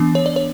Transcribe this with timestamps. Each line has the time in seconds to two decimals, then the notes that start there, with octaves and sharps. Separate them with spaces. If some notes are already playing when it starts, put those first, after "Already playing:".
Already playing: E3 B3 D4
0.15 C#5
0.26 D5
0.36 C#5